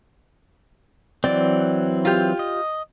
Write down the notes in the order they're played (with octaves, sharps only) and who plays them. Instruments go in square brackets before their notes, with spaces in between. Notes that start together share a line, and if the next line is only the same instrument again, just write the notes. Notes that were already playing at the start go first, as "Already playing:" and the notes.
[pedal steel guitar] E3 F#3 C4 [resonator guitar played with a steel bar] D5
[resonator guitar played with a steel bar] F4 G4
[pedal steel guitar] D#5